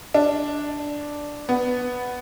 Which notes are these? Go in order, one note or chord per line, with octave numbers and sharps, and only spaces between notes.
D4
B3